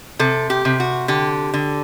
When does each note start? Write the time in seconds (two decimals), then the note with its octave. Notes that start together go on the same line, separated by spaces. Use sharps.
0.19 C3 A4
0.50 G4
0.65 C3
0.80 F#4
1.08 D3 G4
1.54 D3